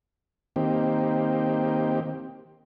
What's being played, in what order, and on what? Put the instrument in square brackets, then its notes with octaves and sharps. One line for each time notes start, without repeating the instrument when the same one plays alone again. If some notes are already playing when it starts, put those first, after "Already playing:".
[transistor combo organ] D#3 A#3 C4 G4